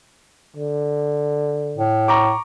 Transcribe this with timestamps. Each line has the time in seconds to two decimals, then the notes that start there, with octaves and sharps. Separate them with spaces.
0.57 D3
1.77 A2
2.08 A#5 C#6 D6